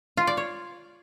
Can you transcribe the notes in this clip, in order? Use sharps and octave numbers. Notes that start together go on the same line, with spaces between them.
F4
D5
C#5